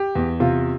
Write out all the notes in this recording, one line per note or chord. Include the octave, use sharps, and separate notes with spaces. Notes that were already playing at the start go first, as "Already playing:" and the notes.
Already playing: G4
E2
C3 F4